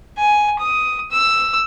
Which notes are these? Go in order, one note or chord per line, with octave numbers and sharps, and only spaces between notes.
G#5
D#6
E6